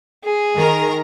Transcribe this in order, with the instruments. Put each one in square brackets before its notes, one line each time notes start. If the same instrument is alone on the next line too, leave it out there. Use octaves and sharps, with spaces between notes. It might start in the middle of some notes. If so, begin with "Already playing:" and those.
[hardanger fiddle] G#4
[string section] D#3 A#4 A#5